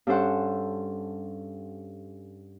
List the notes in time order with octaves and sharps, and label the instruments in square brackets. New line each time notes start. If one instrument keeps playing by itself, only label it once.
[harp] G2 C#4 A4 C5 F#5